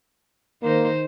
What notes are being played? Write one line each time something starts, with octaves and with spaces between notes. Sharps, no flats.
D#3 A#3 D#4 C5